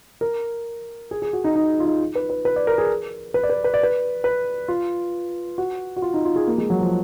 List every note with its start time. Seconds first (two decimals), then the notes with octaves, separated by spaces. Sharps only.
0.21 A#4
1.11 G#4
1.22 G#4
1.33 F#4
1.44 D#4
1.55 D#4
1.80 F4
1.85 D#4
2.15 B4
2.30 B4
2.45 B4
2.56 D5
2.67 A#4
2.78 G#4
3.34 B4
3.43 D5
3.50 B4
3.64 B4
3.74 D5
3.83 B4
4.24 B4
4.68 F4
5.58 F#4
5.96 F#4
6.02 F4
6.14 D#4
6.25 F4
6.36 G#4
6.47 A#3
6.58 G#3
6.70 F#3
6.81 F3